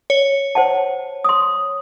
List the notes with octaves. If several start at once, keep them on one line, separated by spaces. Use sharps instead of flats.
C#5
C5 F#5 A5
C6 D#6